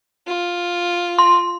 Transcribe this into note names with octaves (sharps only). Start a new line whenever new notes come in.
F4
C6